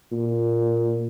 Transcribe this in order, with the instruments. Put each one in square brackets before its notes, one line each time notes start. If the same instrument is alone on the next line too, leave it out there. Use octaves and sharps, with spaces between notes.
[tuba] A#2